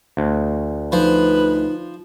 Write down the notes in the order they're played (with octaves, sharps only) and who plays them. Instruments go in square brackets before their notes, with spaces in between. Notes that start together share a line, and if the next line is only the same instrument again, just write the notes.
[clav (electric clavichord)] D2
[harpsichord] F3 [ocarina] D#4 [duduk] B4